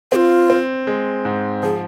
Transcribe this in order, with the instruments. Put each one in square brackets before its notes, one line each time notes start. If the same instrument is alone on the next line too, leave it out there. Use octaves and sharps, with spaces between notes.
[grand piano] C4 [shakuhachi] F4 G#4
[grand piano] C4
G#3
G#2
[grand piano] F3 [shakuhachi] G#4